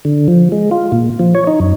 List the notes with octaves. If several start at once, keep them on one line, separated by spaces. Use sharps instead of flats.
D3
F3
G#3
F4
A#2
F3
C#5
D#4
F#2